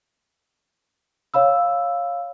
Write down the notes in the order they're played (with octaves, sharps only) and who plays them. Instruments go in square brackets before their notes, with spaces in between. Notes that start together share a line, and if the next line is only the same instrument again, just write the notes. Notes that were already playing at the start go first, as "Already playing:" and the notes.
[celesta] C#5 F5 B5 E6